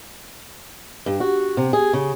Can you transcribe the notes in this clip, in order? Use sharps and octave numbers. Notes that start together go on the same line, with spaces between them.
G2
F#4
C3
G#4
C#3